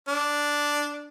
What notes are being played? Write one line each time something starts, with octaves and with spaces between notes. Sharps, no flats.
D4